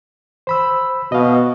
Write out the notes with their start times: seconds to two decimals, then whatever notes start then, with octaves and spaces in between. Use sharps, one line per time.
0.47 C5 B5 E6
1.12 B2 D#5 F5